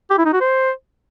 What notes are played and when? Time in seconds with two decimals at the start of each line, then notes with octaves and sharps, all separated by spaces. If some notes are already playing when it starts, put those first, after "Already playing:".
0.10 G4
0.18 E4
0.25 D#4
0.33 F#4
0.40 C5